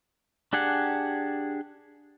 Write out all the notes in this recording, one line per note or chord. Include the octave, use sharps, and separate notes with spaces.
D4 G4 G#4 F#5